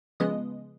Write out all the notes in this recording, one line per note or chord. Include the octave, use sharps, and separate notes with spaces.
C#3 F3 G#3 B3 D#5